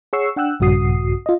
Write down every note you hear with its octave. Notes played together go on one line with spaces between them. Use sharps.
G#4 C#5 F#5 C#6 E6 C7
D4 F#5 G5 E6 F#6
A#1 G2 C#3 F#4 D#6 C7
F4 D#5